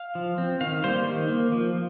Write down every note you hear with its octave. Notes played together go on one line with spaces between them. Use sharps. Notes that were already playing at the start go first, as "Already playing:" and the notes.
Already playing: F5
F3
C4
D#3 F5
G3 A#3 C5
D#3
A#3
F3